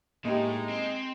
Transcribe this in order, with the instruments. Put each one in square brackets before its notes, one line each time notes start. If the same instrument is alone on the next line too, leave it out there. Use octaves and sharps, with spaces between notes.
[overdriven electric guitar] A2 [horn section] G#3 D#4 [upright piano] A#3 G4
[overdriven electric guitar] C4